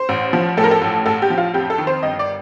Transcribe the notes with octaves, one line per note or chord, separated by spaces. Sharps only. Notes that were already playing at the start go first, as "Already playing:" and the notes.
Already playing: C5
A1
F3
A2 A4
A#4
A4
A1
A1 A4
G4
F3
F4
F2 G4
A4
D#3
C5
G1 D#5
D5